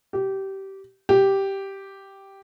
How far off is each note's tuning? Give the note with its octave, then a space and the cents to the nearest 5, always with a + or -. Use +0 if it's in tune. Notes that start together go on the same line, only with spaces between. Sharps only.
G4 -20
G4 -5